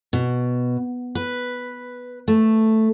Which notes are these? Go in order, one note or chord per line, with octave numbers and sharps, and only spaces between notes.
B2
B4
A3